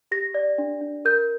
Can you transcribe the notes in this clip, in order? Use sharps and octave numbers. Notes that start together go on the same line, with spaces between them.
G4 A#6
D5
D4
D4
A#4 G6